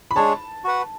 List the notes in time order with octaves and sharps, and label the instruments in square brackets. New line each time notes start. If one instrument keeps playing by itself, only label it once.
[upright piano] B5
[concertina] G#3 D4 G#4 C#5 [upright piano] A5
[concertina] F#4 B4 F#5